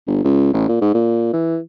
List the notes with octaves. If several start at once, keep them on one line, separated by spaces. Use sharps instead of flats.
G1
C#2
A1
A#2
G#2
A#2
E3